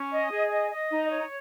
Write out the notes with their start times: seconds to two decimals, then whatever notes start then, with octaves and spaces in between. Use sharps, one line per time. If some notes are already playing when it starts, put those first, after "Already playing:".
Already playing: C#4
0.13 D#5
0.32 G#4
0.51 D#5
0.71 D#5
0.91 D#4
1.10 C#5